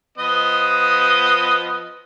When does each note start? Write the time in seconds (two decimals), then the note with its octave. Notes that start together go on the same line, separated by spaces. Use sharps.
0.18 F3 B3 D#5